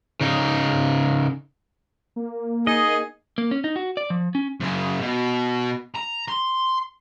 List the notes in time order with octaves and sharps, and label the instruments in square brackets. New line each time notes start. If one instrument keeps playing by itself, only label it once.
[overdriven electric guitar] C#3 D#4
[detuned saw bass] A#3
[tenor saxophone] D#4 [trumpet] G#4 [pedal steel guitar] D#5
[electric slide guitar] A#3
C#4
D#4
F#4
D5
F3
C#4
[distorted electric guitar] F#2 C#3
B2
A#5
C6